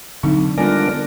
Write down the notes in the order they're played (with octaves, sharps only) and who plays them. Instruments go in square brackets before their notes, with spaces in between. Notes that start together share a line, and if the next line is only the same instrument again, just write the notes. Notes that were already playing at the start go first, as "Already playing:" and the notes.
[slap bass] D3 [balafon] F#3 C4 D#4
[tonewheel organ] D3 D4 A#4 [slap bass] G3 G#3 B3 [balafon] F4 G#5